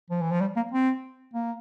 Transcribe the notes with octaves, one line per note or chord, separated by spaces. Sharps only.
F3
E3
F3
G3
A#3
C4
A#3